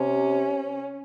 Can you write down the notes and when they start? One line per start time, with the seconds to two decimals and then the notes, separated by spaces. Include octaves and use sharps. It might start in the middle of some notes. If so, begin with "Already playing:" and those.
Already playing: C3 C#4